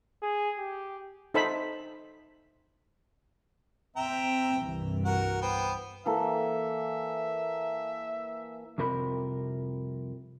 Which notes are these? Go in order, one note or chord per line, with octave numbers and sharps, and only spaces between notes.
G#4
G4
D#4 A4 C5 E5 A5 B5
C4 E5 G5 A#5
C2 G2 E3
F#4 A#4 F#5
B3 C5 G5
E3 A#3 A4 E5
C2 F2 C3 A#4 C5 B5